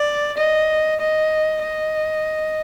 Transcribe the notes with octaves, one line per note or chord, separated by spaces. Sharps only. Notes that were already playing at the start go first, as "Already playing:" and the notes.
Already playing: D5
D#5
D#5
D#5